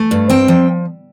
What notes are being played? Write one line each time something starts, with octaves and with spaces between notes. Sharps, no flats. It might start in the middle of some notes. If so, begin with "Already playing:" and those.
Already playing: A3
G2
C4 G5
F3